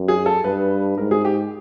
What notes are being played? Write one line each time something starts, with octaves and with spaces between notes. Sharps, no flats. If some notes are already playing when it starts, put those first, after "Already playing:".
Already playing: F#2
G#4
A4
G2 B4
G#2 A#4
G#4
G4